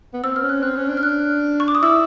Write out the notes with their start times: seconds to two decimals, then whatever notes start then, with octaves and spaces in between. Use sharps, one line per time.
0.13 B3
0.24 C4 E6
0.36 F6
0.42 C#4
0.49 F#6
0.62 C4 F#6
0.76 C#4
0.89 D4
0.97 F6
1.03 F#6
1.60 C#6
1.68 D6
1.75 D#6
1.82 E4 E6